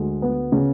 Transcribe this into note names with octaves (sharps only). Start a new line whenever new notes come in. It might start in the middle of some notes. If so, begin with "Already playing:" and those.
Already playing: D2 G#3
B3
C#3